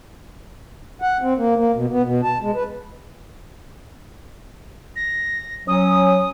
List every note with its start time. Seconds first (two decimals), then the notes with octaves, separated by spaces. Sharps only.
1.02 F#5
1.22 C4
1.38 A#3
1.56 A#3
1.73 B2
1.91 B3
2.04 B2
2.23 A5
2.42 G#3
2.55 B4
4.96 A#6
5.68 F#3 C#4 D#6